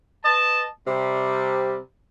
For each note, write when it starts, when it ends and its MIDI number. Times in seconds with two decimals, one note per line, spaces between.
0.24 0.63 71
0.24 0.63 75
0.24 0.63 81
0.87 1.78 48
0.87 1.78 55